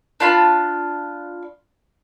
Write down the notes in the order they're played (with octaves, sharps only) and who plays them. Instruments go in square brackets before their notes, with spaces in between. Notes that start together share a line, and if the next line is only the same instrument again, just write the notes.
[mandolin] D4 F4 B5